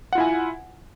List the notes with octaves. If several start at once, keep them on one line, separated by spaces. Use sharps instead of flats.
E4 F4 F#5 G#5